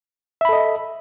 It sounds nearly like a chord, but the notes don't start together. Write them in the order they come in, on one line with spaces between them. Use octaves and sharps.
E5 B5 A4 D#5